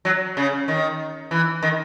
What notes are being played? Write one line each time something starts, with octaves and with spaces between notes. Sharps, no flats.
F#3
C#3
D#3
E3
D#3